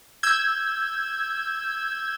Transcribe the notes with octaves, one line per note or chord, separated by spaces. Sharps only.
E6 G6 G#6